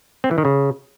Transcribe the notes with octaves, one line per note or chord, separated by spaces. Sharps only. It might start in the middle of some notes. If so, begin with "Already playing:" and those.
C4
E3
D#3
C#3